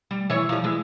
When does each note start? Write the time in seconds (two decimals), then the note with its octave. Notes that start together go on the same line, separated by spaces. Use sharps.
0.11 G3
0.30 E3 C#5
0.49 F3 G3
0.64 E3 G#3